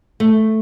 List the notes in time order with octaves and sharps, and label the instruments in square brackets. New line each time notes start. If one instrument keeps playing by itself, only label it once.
[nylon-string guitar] A3